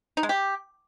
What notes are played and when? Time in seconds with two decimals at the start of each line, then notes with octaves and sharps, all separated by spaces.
0.17 D#4
0.23 G#3
0.29 G4